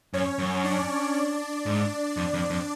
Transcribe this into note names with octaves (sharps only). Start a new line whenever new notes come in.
F#2 C#4 C#5
F#2
D4 D5
D4 D5
G#2
F2
F2
F2